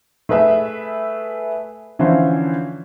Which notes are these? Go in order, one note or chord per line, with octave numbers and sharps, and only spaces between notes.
A3 G#4 B4 E5
D3 E3 F3 C#4 E4 C5